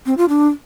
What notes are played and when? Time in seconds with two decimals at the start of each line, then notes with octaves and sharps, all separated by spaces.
0.06 C4
0.17 F4
0.29 D4